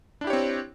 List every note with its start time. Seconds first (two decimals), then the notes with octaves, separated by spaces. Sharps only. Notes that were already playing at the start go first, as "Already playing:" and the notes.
0.21 D4
0.24 E4
0.27 G4
0.30 C#5
0.33 C4